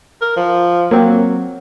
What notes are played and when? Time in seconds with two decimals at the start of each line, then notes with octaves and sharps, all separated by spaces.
0.21 A#4
0.36 F3
0.91 F#3 A#3 C4